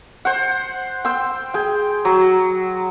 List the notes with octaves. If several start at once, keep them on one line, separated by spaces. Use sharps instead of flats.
C5 F#5
G5 C6 E6
G#4 G5
F#3